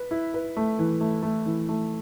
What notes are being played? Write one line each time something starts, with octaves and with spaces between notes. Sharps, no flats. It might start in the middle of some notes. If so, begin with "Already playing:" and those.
Already playing: B4
E4
B4
A3
E3
A3
A3
E3
A3